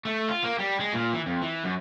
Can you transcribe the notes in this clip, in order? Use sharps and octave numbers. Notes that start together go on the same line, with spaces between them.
A3
F4
A#3
G3
G#3
A#2
E3
F2
E3
F#2